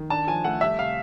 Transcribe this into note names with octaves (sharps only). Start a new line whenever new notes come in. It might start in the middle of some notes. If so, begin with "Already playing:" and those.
Already playing: D#3
D4 A5
F3 G#5
A3 F#5
G3 E5
C3 F5